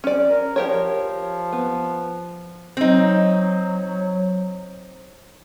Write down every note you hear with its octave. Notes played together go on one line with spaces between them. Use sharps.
C#4 D5
A#4
F3 G4 A#4 C#5
B3
F#3 C4 D#4